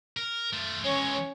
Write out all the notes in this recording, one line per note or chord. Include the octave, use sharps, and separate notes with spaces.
A#4
A3 F4
E3 G#3 C#4 C#5